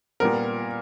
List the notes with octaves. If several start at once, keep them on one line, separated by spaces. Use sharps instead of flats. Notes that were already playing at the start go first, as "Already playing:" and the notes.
A#2 G3 B3 A#4